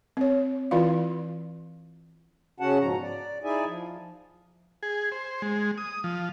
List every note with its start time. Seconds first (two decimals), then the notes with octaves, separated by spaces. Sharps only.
0.17 C4 C#5
0.71 E3 E4 F4 D5 F5
2.60 C#3 C#4 F#4 F#5 A5
2.80 G#2 B2 F3 A#5
3.02 D5
3.44 D#4 E4 G#4 D5 E5 G#5
3.67 F3
4.83 G#4
5.12 C5
5.42 G#3
5.78 D#6
6.04 F3